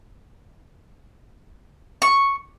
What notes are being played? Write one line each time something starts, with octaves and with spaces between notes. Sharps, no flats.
C#6